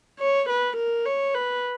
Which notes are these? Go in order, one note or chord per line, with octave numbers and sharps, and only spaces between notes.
C#5
B4
A#4
C#5
B4